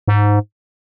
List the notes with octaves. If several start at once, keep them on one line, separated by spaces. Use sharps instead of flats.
G#2